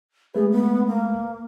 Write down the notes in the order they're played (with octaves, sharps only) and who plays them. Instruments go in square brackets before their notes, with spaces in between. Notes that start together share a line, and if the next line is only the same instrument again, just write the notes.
[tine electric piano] G#3 A3 B4 [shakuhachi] G#4
[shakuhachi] B3
A#3